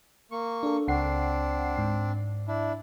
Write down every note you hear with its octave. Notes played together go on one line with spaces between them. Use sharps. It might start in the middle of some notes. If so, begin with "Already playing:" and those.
A#3 C#6
D4 A4
C#2 C4 D4 F#5 C7
G#2
D4 E4